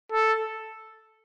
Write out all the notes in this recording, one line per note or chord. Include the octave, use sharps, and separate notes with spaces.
A4